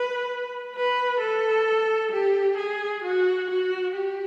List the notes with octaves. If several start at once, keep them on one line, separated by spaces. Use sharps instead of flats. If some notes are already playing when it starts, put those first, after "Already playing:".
Already playing: B4
B4
A4
G4
G#4
F#4
F#4
G4